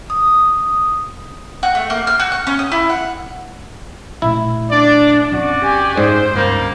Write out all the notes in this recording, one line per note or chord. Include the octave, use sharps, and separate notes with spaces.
D#6
F#4
A3
A#3
F6
F#4
C#6
C#4
D#6
E4
F#5
A#2 A3 E4
D4 D5
F#2 C4 F#4 D5
G4 G#5
G#2 C5
G1 C#2 G3 A#3